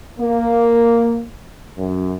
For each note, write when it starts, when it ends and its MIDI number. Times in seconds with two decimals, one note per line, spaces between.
0.20 1.24 58
1.77 2.14 42